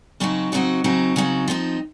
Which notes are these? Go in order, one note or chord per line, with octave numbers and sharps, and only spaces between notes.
C#3 F#3 C4 D#4 F#4
C#3 F#3 C4 D#4 F#4
C#3 F#3 C4 D#4 F#4
C#3 F#3 C4 D#4 F#4
F3 C4 D#4